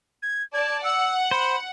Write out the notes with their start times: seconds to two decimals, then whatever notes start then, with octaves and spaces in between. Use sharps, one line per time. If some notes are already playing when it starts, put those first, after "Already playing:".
0.23 G#6
0.54 D5 A5 G#6
0.84 F#5 E6
1.31 C5 B5